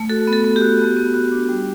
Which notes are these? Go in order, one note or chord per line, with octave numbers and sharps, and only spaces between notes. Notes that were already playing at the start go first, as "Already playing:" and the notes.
Already playing: A3
F#4 A4
B3
A4
B3
G4
F#4
B3
B3
F#4
D4
G3